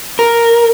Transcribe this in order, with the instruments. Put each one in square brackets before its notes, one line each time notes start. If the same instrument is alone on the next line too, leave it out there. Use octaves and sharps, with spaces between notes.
[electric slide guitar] A#4